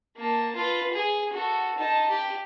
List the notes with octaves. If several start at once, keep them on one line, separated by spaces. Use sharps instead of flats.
A#3 A5
F4 B4
G#4
F#4 A4
D#4 A5
G4